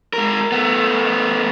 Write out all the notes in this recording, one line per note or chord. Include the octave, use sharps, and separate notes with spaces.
G#3 A#4
A3 B3